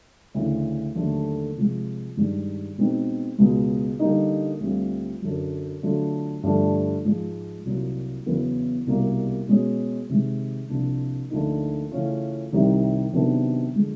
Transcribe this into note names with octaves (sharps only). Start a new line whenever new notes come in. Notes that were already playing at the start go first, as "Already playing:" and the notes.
D2 C#3 E3
D#2 D3 F#3 A3
C3 F3 G#3
G2 D#3 G#3
B2 G#3 C4 D#4
C#2 B2 G#3
D3 G3 A#3 D#4
D2 D3 G3 C4 F4
F#2 D3 F#3
D3 F#3 A3 D4 F4
G2 D3 F3 A3 D4
G#2 F3 G#3
C2 A#2 F#3 A#3
E2 C#3 F#3 B3 E4
C2 B2 G3 A#3
B2 G#3 C#4
C3 D#3 G#3
C2 C3 F3 A#3 D4
D2 D3 F3 A#3 D#4
C#3 E3 A3 C#4 F4
C2 C3 D#3 G3
C3 D#3 F#3 B3 D4
D3 F3 G#3